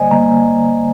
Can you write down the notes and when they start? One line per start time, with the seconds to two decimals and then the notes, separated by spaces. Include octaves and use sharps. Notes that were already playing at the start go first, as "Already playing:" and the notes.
Already playing: D3 G3 A#3 C5 D5 D#5 G#5
0.11 D3 G3 A#3 A#5